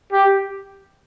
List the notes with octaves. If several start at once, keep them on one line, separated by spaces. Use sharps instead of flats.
G4